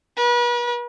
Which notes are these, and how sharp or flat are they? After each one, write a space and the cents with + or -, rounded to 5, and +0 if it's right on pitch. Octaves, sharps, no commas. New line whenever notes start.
B4 -40